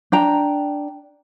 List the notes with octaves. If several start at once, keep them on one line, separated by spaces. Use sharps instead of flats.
D4 G5 A#5